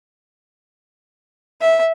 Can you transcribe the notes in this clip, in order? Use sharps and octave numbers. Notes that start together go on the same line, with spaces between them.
E5